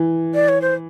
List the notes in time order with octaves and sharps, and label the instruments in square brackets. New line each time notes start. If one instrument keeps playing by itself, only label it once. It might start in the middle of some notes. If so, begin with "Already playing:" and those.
Already playing: [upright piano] E3
[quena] D5
C#5
C5